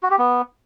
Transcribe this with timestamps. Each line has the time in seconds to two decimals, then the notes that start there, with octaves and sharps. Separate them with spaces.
0.03 F#4
0.11 G4
0.19 B3